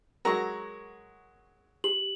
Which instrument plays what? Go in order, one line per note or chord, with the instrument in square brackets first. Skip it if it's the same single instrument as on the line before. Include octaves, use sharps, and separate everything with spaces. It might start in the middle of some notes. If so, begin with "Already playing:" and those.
[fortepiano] F#3 G#3 F#4 [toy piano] A#4 F#5 [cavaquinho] A#5 C#6
[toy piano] G4 [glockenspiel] F#7